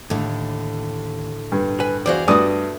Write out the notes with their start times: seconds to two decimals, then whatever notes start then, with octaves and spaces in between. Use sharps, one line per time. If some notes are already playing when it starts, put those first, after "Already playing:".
0.10 D#2 A2 D3
1.52 G2
1.80 B4 G#5
2.06 E2 F#4 G#4 C5 D5 F5
2.28 G2 A3 F#4 D5 D#6